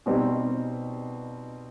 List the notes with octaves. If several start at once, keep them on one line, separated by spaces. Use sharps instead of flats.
B2 G3 C4 D#4